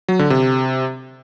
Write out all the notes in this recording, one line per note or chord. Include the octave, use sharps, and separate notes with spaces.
F#3
D3
C3